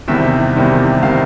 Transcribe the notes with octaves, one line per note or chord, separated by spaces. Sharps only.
E2 C3 D#3 G3 E5
E2 C3 D#3 G3
C3 D#3 G3 F5